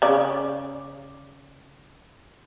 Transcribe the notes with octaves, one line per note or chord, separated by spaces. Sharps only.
C#3 D5